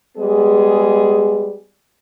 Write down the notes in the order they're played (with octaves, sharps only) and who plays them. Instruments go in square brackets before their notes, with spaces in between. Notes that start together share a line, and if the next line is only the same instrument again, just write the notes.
[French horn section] G3 G#3 B3 G#4